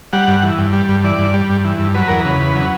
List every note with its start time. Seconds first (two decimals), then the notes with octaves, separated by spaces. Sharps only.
0.13 G3 F#5
0.28 G2
0.43 E3
0.58 G2
0.73 G3
0.89 G2
1.04 E3 D5
1.19 G2
1.34 G3
1.50 G2
1.65 E3
1.79 G2
1.94 F#3 B4
2.08 E2 A#4
2.20 C#3 B4
2.40 E2
2.56 F#3